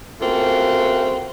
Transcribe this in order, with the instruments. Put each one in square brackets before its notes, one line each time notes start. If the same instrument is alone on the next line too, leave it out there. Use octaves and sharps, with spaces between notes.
[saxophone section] C#3 A3 A#3 C4 F4 F#4